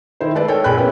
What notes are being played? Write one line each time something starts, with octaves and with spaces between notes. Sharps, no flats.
D#3 E4 C5
G#3 A4 B4 D5
A4 A#4 C#5 G5 G#5
A#1 A#2 G5 B5 F#6
A#3 B3 C#4 E4